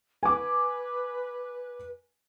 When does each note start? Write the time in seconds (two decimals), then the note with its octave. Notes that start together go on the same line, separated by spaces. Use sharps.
0.23 B4 G#5 D6